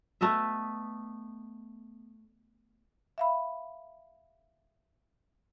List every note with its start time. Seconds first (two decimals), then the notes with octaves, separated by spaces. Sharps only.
0.21 A3 B3 D#5 E5
3.18 E5 F5 B5